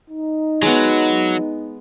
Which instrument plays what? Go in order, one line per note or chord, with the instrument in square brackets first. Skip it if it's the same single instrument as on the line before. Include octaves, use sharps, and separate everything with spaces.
[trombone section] D#4
[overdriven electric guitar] F#3 [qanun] G#3 B3